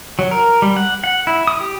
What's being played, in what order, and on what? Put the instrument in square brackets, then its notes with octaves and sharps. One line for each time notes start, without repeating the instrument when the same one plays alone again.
[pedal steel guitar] F#3
A#4
G3
F#5
F#5
E4
D#6
G4